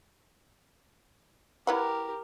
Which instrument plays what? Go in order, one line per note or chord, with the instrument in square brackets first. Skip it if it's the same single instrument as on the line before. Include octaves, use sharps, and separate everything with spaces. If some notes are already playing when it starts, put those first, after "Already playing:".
[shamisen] E4 B4 F#5 [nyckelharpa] G4 A#4